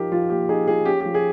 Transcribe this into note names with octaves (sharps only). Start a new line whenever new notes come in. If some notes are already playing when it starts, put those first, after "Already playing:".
Already playing: F3 D#4 G4 A#4
F3 F4
A#3 G4
D#4 G#4
F3 G#4
C#4 G4
F3 G4
G#4